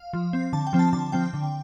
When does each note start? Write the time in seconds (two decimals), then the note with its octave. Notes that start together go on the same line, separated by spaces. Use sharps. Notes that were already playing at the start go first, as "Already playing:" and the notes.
Already playing: F5
0.13 F3
0.33 C4
0.53 D3 A5
0.67 G5
0.73 F3 C4
0.79 A5
0.93 D3 A5
1.12 F3 C4 G5
1.33 D3